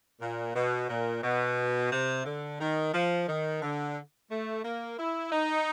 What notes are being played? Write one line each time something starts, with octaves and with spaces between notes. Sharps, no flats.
A#2
B2
A#2
B2
C3
D3
D#3
F3
D#3
D3
A3
A#3
E4
D#4